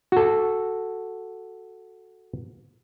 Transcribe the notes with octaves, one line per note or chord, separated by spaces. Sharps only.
F#4 A4